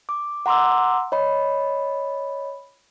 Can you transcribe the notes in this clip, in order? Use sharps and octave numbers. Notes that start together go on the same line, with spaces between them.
D6
F#5 A#5 C6 D6 E6
C#5 D#5 B5